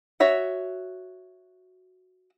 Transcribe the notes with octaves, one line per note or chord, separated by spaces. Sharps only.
F#4 C#5 E5 F#5